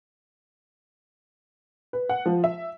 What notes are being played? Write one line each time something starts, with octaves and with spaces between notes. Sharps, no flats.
B4
F#5
F3
E5